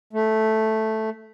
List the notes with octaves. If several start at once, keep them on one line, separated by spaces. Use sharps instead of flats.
A3